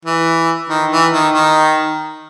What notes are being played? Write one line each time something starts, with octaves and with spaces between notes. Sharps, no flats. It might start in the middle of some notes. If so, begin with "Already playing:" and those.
E3
D#3
E3
D#3
D#3